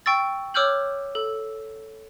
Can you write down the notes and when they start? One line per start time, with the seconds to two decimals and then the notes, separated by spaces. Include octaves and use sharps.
0.06 G5 C#6 E6 A6
0.54 C#5 D6 E6 F6 G6 F#7
1.15 A4